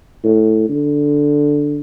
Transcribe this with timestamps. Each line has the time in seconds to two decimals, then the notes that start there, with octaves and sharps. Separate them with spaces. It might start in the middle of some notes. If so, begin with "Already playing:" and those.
0.24 A2
0.69 D3